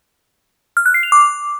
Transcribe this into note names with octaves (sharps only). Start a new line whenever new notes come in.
F6
F#6
C7
F7
D6